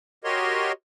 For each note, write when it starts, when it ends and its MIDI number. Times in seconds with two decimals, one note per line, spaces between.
0.24 0.72 66
0.24 0.72 67
0.24 0.72 70
0.24 0.72 73
0.24 0.72 75
0.24 0.72 84